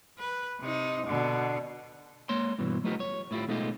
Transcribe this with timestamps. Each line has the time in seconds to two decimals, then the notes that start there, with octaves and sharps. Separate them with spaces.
0.19 B4
0.60 C3 D#4
1.07 B2 D3
2.29 G#3 A#3 C#5 C6
2.59 G2 B2 E3
2.84 F#3 A3 B3 D#4 F4 G4
3.00 C#5
3.31 A2 E4 F4 G4
3.48 B2 G#3 A3 D#4 F4 G4